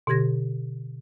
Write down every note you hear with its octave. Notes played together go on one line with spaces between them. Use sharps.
B2 D3 G4 G#6 A#6